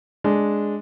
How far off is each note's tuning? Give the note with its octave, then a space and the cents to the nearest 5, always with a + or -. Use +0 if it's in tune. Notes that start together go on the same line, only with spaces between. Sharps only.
G#3 +0 D4 +0